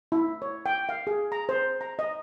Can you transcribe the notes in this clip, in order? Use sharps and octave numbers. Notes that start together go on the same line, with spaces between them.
E4
C#5
G5
F5
G#4
A#5
C5
A#5
D#5